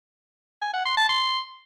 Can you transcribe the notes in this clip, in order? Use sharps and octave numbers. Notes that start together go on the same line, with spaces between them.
G#5
F#5
C6
A5
C6